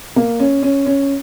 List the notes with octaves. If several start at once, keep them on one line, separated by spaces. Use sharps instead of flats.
A#3
C#4
C#4
C#4